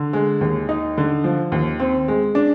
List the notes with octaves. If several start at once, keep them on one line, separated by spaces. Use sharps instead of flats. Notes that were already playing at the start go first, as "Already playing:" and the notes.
Already playing: D3
G#3
D#2
D#4
D3
F3
D#2
C4
G#3
D4